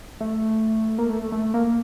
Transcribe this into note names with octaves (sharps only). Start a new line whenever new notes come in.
A3
A#3
A3
A3
A#3